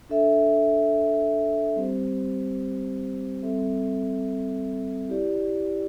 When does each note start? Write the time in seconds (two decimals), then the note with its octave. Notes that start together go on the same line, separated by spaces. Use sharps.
0.09 D4 A4 E5
1.75 G3 C4 G4 C5
3.42 G3 C4 A4 E5
5.09 E4 G4 D5